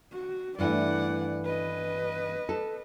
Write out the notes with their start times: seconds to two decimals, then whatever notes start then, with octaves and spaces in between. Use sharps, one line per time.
0.12 F#4
0.58 G2 E3 A3 D5 F#5
1.44 B4 D#5
2.49 A4